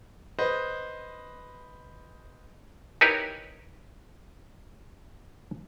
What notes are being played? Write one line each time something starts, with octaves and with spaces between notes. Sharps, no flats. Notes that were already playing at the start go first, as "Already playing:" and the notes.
B4 C5 D#5
D#4 E4 G4 A#4 B4 C#5